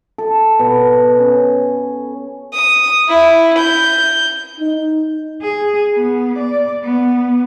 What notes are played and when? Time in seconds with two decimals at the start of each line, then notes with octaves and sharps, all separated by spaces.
0.18 A4
0.59 B2
1.19 C#4
2.54 D#6
3.09 E4
3.59 G6
4.60 D#4
5.42 G#4
5.94 B3
6.38 D5
6.84 B3